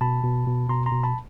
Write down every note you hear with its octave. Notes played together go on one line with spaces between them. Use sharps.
B2 A5 B5
B2
B2
B2 A#5 C6
A#5 C6
B2
A5 B5